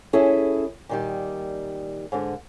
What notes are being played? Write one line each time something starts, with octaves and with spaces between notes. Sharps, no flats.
C#4 E4 G#4 A4
A#2 D#3 G3
G#2 D3